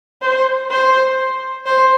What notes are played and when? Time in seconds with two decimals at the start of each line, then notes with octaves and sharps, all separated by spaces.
0.22 C5
0.71 C5
1.67 C5